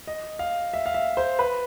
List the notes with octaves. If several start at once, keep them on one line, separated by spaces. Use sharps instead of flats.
D#5
F5
E5
F5
E5
C5
B4